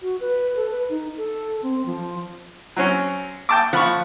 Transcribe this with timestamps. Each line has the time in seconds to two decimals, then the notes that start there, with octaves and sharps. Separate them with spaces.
0.01 F#4
0.20 B4
0.56 A4
0.71 B4
0.90 D#4
1.17 A4
1.63 C4
1.86 F3
2.76 F#3 C4 C#4
3.49 G5 A5 D6
3.73 F3 F#5 B5 C#6